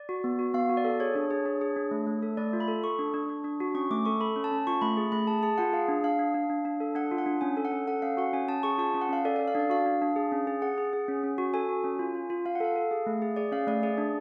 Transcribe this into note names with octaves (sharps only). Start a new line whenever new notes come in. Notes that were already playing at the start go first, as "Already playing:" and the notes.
Already playing: D5
F#4
B3
F#4
B3 F5
F#4
D5
A4
G#4 C#5
D4
G#4 C#5
D4
G#4
D4
A3
A3
A4
A3 D5
F4
B5
A4
A4 C#6
D4
D4
D4
D4
F#4
C#4 C#6
A3 D6
A4 C#6
A4 B5
C#4
A5
C#4
F4 C#6
A3 B5
G#4
A3 B5
G#4 A5
G#4 A5
F4 F#5
G#4 F5
D4
D4 F5
D4
D4
D4
D4
A4
D4 F#5
F4
F#5
D4
C#4 G#5
A4
F#5
C#4
A4 F#5
C#4 F5
F#4 F#5
C#4 G#5
C#4 A5
G#4 C#6
F4 A5
C#4
F#5
C#4 F5
A4 D5
A4 D5
F5
D4 D5
F#4 F5
D4
D4
G#4
C#4
G#4
G#4 F#5
G#4
G#4
C#4
C#4
F#4
A4 G#5
F#4
C#4
F4
F4
F4
F4 F5
F#5
A4 F5
A4
G#4
A3
G#4
G#4 D5
C#4 F5
A3 D5
G#4 D5
D4